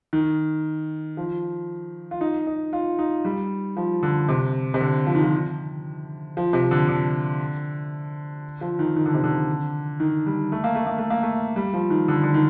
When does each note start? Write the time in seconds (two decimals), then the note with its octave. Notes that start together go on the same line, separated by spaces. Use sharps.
0.13 D#3
1.17 F3
2.11 F4
2.21 D#4
2.47 D#4
2.73 F4
2.99 D#4
3.25 G3
3.77 F3
4.03 D3
4.29 C3
4.74 C3
4.80 D3
5.06 F3
5.15 D#3
5.23 F3
6.37 F3
6.53 C3
6.71 D3
6.89 D3
8.61 F3
8.79 D#3
8.96 D#3
9.05 D3
9.14 C3
9.24 D3
10.00 D#3
10.26 G3
10.52 A3
10.64 A#3
10.75 A3
10.87 A#3
10.98 A3
11.10 A#3
11.23 A3
11.56 G3
11.74 F3
11.90 D#3
12.08 D3
12.23 D3
12.34 D#3